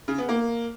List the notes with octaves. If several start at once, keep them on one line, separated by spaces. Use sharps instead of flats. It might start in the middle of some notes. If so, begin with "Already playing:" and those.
C#3
B3
A#3